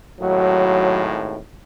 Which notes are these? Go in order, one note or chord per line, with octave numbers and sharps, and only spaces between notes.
G#1 D#2 A2 F#3